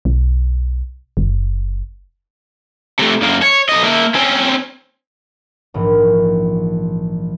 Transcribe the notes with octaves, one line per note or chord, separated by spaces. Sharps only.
B1
F#1
C3 A3
F#2 A#3
C#5
B1 D#5
A#3 E5
C4 C#4
A#1 G#2 E3